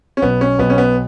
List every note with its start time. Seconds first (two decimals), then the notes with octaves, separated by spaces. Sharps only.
0.17 C#4
0.22 B1 B3
0.41 C#4
0.59 B1 B3
0.70 C#4
0.78 B3